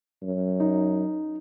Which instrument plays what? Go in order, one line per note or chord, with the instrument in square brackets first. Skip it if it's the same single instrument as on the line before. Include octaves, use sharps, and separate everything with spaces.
[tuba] F#2
[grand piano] D#4